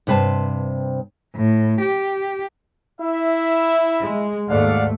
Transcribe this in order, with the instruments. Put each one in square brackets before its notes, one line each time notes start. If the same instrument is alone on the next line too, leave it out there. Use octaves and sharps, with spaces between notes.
[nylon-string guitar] G2 C3 B4 C5 A5
[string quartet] A2
G4
[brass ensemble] E4 E5
[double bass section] G#3
[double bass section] D#2 G#2 A3 [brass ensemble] D5 F5 F#5